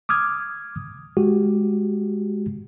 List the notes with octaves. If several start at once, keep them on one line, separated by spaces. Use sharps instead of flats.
D6 D#6 F6 G#6
G#3 F#4 G4